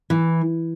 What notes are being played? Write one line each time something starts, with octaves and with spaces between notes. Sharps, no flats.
E3